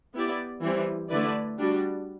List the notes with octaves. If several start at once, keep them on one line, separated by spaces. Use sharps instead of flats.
B3 E4 G4 D5
E3 G3 C4
D3 A3 E4 B4 D5
G3 D4 F#4